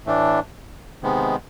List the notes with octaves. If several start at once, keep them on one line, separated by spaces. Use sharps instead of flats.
A2 E3 A3 D4
C3 D#3 G#3 B3